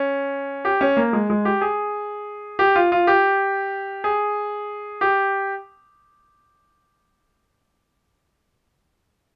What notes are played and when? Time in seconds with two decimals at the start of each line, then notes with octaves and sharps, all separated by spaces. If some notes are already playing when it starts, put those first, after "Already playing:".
Already playing: C#4
0.65 G4
0.81 C#4
0.97 A#3
1.13 G#3
1.30 G#3
1.45 G4
1.61 G#4
2.59 G4
2.75 F4
2.92 F4
3.07 G4
4.04 G#4
5.01 G4